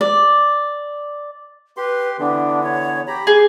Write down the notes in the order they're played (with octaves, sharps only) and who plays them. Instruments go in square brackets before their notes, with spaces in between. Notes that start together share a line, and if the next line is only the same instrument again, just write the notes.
[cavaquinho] D5
[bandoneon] G4 C6 [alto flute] B4
[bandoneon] D3 E3 B3 [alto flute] D4
[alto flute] C#5
[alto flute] G4 [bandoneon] A#5 B5
[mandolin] G#4 [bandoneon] G6